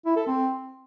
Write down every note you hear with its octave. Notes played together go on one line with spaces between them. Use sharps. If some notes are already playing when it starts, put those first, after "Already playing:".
E4
A4
C4